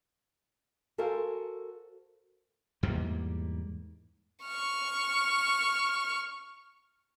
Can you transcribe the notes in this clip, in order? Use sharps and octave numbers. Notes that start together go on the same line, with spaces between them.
F#4 A4 A#4 C5 F5 G#5
E2 G#2 G3 A#3
C#6 F6